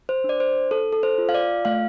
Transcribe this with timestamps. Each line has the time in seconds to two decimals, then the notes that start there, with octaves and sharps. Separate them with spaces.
0.09 C5
0.24 D4
0.29 D5
0.40 C5
0.71 A4
0.93 A4
1.03 C5
1.18 F4
1.29 F5
1.34 D5
1.65 A3 F5